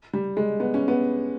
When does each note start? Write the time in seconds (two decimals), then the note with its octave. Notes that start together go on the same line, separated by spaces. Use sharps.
0.13 G3
0.37 G#3
0.60 B3
0.74 C#4
0.88 B3